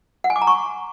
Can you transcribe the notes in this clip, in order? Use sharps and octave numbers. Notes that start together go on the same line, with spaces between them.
F#5
G#5
D6
A#5
C#6